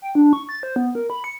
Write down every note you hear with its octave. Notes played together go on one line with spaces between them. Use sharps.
G5
D4
C#6
A6
C5
B3
A#4
B5
C#7